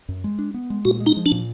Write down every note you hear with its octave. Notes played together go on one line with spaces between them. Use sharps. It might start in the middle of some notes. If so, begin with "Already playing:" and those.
F#2
G#3
D4
B3
G#3
A#2 F#4
G#3
D#4
F3
D4
A#2